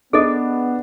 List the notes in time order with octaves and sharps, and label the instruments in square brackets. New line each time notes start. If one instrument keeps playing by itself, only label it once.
[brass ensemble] B3 [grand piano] D4 [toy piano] G#4 A4 D#5